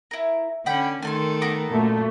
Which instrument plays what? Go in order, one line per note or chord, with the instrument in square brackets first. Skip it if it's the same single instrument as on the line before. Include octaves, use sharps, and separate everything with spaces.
[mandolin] E4 A#4
[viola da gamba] D3 C#4 [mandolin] F#5 G5 B5
[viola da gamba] D#3 A3 A4 [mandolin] G#5 A5 C6
[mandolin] B3 A#4 D6
[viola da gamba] F#2 A#2 [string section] A3